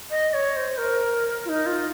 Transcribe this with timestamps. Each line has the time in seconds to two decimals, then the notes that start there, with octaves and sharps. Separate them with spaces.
0.10 D#5
0.34 C#5
0.56 C5
0.78 A#4
1.45 F4
1.49 D#4
1.66 F4